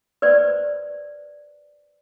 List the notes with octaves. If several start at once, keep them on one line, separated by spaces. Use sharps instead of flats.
B4 C5 D5